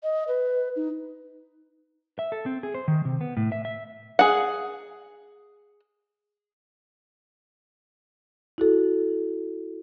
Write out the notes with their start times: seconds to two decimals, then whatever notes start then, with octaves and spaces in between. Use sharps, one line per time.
0.03 D#5
0.28 B4
0.76 D#4
2.19 E5
2.32 A4
2.46 C4
2.63 G#4
2.74 C5
2.88 D#3
3.05 C3
3.21 B3
3.37 A2
3.52 E5
3.65 E5
4.19 G#4 F#5
8.58 E4 F#4 A4